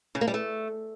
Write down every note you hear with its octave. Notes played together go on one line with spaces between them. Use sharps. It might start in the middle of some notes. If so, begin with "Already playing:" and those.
C#3
A#3
G3
A3